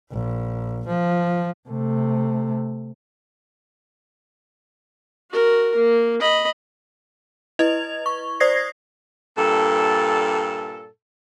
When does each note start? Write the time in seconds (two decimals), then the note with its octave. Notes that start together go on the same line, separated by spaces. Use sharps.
0.12 A#1
0.87 F3
1.69 C3 A3
5.30 F#4 A#4
5.76 A#3
6.20 D#5 B5
7.59 E4 B4 D#5 G#6 F7
8.06 C#6
8.40 C5 D5 D#6 G#6 A#6 C7
9.37 G2 A#2 A4